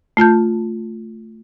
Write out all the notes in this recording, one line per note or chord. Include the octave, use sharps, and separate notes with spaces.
A3 F4 A5 G6